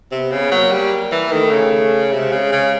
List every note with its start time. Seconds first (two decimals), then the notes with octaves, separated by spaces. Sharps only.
0.11 C3 B3
0.31 C#3
0.40 B3
0.51 F#3 A#3
0.71 G3
1.11 E3
1.31 D#3 A3
1.51 C#3
2.12 C3 G#3
2.32 C#3
2.52 C#3